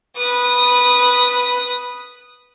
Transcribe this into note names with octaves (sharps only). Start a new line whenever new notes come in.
B4 D#6